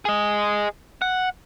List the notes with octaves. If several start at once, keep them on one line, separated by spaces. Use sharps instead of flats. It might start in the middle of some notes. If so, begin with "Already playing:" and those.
G#4 D#5
F#5